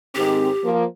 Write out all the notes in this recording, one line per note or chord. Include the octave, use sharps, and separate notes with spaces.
G#2 D#3 C4 G4
F3 A#3